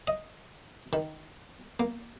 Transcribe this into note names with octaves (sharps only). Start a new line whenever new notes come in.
D#5
D#3
A#3